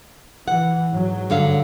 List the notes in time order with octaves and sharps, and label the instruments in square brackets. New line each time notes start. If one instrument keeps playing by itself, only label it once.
[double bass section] E3 [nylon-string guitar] F#5
[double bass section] G#2 F#3
[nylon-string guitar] G2 D3 F5